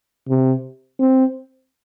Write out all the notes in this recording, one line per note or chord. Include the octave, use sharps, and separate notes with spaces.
C3
C4